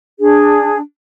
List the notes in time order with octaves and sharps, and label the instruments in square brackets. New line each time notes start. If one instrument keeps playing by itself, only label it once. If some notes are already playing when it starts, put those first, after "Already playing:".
[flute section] D4 G#4